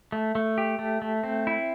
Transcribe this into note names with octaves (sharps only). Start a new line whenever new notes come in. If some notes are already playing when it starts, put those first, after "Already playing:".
A3
A3
G4
A3
A3
C4
E4